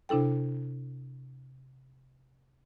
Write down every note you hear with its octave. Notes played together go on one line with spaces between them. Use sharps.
C3 D4 E4 A4 G5